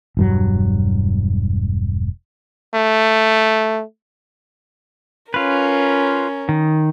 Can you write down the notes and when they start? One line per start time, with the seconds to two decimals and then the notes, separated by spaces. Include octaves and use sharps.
0.17 E1 G2 F#3
2.74 A3
5.34 C#4 F4 A#4 B4
6.49 D#3